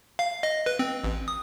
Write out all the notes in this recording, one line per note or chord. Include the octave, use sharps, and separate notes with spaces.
F5
D#5
B4
C4
A1
D#6